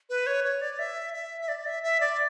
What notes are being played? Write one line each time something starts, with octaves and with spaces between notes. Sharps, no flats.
B4
C#5
C#5
D5
E5
E5
E5
D5
E5
E5
D5